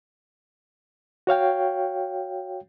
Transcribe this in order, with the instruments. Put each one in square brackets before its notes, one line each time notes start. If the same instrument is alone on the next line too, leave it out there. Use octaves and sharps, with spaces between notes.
[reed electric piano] F#4 C#5 F5 G5